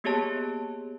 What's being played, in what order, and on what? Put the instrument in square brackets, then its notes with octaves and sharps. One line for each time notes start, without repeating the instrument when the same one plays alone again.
[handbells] A#3 B3 G4 G#4 C#5 A5